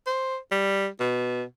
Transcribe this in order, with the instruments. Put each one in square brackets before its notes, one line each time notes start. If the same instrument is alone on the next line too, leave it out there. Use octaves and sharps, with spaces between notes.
[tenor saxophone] C5
G3
B2